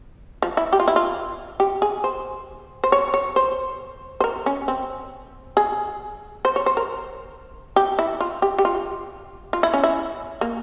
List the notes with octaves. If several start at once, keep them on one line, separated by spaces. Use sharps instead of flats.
F3
E4
G4
F4
E4
F4
G4
G#4
C5
C5
C#5
C#5
C5
C5
A#4
C#4
C4
G#4
C5
C#5
C5
A#4
G4
E4
F4
G4
G4
F4
F4
E4
C#4
E4
A#3